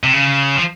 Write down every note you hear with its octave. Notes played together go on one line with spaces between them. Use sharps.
C3
C#3
F3